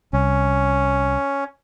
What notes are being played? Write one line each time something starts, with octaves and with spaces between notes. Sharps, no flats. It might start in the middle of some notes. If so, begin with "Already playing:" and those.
C2 C#4